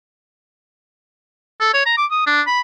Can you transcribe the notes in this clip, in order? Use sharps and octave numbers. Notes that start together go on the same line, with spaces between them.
A4
C#5
A#5
D6
D#6
D4
B5